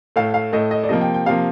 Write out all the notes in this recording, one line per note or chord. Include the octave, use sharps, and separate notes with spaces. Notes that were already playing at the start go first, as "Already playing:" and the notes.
A2 A3 F5
F5
A2 A3 D#5
D#5
D5
C3 F3 A#3 D#5
G5
G5
C3 F3 A#3 F5